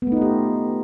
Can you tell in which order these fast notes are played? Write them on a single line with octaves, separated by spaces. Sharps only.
B3 A3 D#4 F4 G4